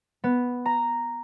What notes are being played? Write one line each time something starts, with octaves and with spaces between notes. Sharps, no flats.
B3
A#5